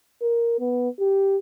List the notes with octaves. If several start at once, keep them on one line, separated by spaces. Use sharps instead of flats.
A#4
B3
G4